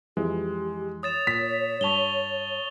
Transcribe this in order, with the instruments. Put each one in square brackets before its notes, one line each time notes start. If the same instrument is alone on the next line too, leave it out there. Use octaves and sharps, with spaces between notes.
[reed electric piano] F2 E3 [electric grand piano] G#3 [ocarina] G4
[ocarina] C#5 [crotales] D#6 A6 E7
[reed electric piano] A#2 [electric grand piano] B6
[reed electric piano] G2 A5 [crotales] C#6 F7 G7